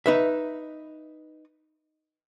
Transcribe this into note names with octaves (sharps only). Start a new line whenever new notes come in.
D#4 B4 E5